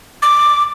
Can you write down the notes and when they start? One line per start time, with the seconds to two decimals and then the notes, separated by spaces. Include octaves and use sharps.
0.22 D6